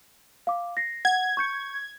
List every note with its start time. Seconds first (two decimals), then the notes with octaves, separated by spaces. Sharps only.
0.47 F5 D6
0.77 A#6 C7
1.05 F#5 G#6
1.37 C#6 G6 C#7